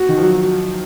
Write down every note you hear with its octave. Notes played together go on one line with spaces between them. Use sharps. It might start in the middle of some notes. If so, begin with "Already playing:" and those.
Already playing: F#4
D#3
F3
F#3